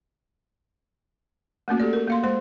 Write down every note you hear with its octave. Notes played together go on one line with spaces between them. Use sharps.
A3 A#3 C#4 F#4
G4 A4 D5
A#4
A#3 F5 C6
G#3 C5 C6